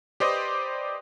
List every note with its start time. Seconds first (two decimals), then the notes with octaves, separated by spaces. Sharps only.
0.20 G4 B4 C5 D5 D#5